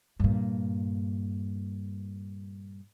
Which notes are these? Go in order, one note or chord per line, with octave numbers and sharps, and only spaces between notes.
G2 A#2